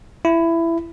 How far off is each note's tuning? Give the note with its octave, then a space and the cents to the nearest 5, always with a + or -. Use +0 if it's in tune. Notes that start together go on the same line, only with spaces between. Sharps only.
E4 +15